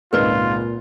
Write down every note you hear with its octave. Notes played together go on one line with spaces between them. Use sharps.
G#1 C#2 A#2 D#4 F4 A#4 B4 D5